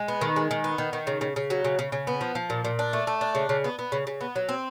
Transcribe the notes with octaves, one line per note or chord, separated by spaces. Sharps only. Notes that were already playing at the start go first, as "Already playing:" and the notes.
Already playing: G#3
B3
D#3
G#3
D#3
B3
D#3
D#3
C#3
C#3
C#3
F#3
C#3
C#3
C#3
B3
F3
F3
A#2
A#2
D4
A3
A3
D4
C#3
C#3
B3
B3
C#3
C#3
B3
F#3
C4